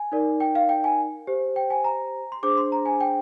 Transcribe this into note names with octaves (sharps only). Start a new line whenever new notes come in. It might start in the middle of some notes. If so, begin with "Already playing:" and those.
Already playing: G#5
D#4 A#4 D5
G5
F5
G5
G#5
G4 C5
G5
G#5
A#5
C6
D4 G#4 C5 D6
C6
A#5
G#5
G5